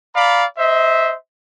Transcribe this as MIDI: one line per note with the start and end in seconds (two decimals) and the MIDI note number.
0.15 0.45 74
0.15 0.45 77
0.15 0.45 82
0.15 0.45 83
0.58 1.14 72
0.58 1.14 75
0.58 1.14 76